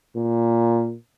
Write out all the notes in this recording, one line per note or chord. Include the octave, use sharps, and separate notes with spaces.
A#2